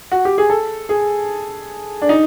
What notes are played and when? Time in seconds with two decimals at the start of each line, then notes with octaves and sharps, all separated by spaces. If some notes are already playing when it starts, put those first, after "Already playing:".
0.11 F#4
0.25 G4
0.38 G#4
0.50 A4
0.89 G#4
2.02 D4
2.09 D#4